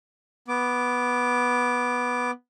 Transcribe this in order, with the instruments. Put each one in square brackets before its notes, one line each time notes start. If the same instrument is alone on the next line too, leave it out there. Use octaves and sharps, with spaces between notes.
[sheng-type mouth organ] B3 D6